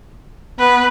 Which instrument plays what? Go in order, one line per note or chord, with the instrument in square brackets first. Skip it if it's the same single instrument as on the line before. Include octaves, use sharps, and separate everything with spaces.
[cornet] B3 [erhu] B4